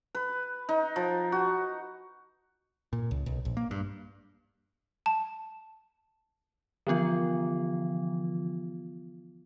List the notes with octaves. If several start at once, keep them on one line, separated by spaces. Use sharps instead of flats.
B4
D#4
F3
F#4
A#2
C#2
B1
A#1
A#3
G2
A5
D3 E3 F3 B3 F4